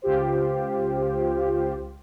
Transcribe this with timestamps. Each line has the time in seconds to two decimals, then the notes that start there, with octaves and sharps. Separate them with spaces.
0.02 C#2 F4 G4 C5